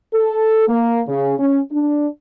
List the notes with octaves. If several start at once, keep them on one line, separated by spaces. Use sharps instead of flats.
A4
A#3
C#3
C#4
D4